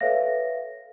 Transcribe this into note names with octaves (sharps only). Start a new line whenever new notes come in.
A4 B4 C#5 E5 F5 A#6